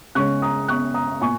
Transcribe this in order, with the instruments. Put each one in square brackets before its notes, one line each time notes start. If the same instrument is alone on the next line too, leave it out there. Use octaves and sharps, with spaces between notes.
[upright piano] C#3 G#3 C#4 C#6 F#6
A#5 D#6
C#6 F#6
A#5 D#6
A#2 G#5 C#6